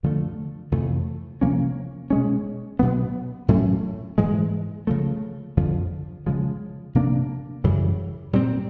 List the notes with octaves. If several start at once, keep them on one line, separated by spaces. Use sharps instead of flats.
F2 D3 F3 A3
F2 C3 E3 A3
C3 F3 A#3 C#4
B2 G#3 C#4
B2 F#3 B3
A2 F#3 A3 C#4
G#2 E3 G#3
C#3 F3 A3
F2 D3 F3
C#3 F3 G#3
C3 F3 A#3 D4
F#2 C#3 E3 G3
A#2 G3 C4